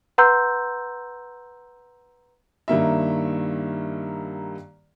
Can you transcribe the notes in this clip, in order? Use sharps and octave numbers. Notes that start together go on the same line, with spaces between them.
B4 F#5 A#5 C6 E6 G6
G2 D#3 A#3 E5